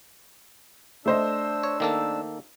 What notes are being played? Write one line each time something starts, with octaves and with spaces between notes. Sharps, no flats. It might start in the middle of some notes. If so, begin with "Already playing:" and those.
A3 D4 C5 D#5 E6
C#5
D#3 A#3 A4